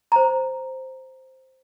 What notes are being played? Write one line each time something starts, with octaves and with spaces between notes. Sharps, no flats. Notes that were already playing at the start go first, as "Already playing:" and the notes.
C5 A#5